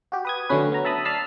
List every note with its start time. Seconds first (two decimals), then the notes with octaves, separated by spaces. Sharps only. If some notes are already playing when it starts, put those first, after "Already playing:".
0.12 F#4 G4
0.25 B4 D#6 G#6
0.49 D3 F#3 A3 C#4 B4
0.72 B3 A#5
0.85 E5 A5 B5 D#6
1.05 D5 A5 E6 F6 B6 C7